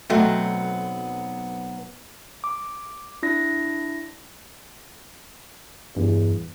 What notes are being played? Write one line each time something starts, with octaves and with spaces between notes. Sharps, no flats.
B1 F#3 A3 B3 C4
D6
D4 E4 A#6
E2 G2